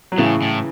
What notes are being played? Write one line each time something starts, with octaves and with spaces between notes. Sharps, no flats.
F#3
A2 C#3 E3
A2